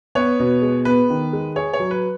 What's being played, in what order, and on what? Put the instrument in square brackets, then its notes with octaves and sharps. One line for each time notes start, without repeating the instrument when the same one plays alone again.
[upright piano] B3 [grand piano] C#5
[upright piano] B2
G#3
[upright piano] B3 [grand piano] B4
[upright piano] D#3
G#3
[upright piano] G#4 [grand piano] C#5
[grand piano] C#5
[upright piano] F#3
[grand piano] B4